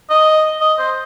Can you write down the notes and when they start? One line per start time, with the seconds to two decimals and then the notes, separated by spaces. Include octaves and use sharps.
0.10 D#5
0.61 D#5
0.79 C5